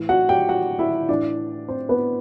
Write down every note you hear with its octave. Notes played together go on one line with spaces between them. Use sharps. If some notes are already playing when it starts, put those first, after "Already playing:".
Already playing: A2 E3
F#4 F#5
G4 G5
F#4 F#5
E4 E5
A2 E3 D4 D5
C4 C5
B3 B4